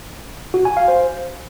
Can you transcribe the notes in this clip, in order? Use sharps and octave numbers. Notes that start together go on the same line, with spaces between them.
F#4
G#5
F5
C5